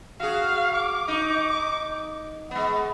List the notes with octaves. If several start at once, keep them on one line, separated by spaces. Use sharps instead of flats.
F#4 G#4 F5
D6
D#4
G#3 B3